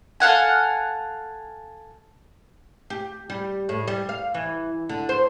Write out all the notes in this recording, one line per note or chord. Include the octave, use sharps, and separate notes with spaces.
A4 F5 F#5 G#5
G4
G3
A2
G3
F5
E3
D3
C5